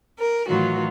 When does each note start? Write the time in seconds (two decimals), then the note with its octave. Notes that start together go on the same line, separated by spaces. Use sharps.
0.18 A#4
0.48 A2 D#3 E3 F#3 F4 F#4